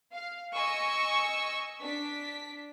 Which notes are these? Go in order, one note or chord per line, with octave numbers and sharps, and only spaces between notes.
F5
D#5 G#5 C#6 E6
D4 B6